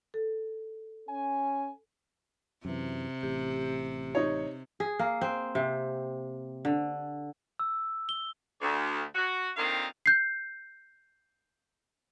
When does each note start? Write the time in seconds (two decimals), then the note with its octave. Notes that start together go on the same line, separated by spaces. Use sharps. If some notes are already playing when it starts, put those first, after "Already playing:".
0.14 A4
1.10 C#4 G#5
2.65 F#2 C3 E3
3.23 A1 G4
4.15 D#4 C#5
4.80 G#4
4.99 A#3
5.21 C4
5.55 C3
6.65 D3
7.59 E6
8.09 G7
8.62 D2
9.15 F#4
9.57 A#2 D3 D#3 C4 D#5 F5
10.06 G6 C7